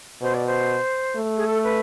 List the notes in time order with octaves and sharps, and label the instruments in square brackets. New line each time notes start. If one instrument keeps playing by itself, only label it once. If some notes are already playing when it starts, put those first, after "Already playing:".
[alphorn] B2 [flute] C5
[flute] D5
C5
[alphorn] A3
[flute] G#4
A4
B4